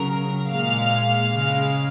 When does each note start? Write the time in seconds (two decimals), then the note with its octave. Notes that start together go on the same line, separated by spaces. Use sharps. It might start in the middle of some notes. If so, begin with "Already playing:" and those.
Already playing: C#3 F#3 A#4
0.50 A#2 G#3 F5
1.30 C#3 G#3